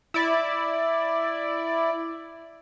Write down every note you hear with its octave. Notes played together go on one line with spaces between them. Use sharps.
E4 D5